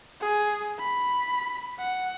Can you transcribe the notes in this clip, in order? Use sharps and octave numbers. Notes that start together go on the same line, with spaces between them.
G#4
B5
F#5